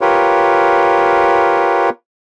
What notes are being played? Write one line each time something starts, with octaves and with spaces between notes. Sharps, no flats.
F4 G4 A#4 B4 C#5